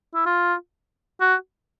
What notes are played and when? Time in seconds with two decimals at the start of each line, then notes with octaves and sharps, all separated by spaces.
0.15 E4
0.26 F4
1.20 F#4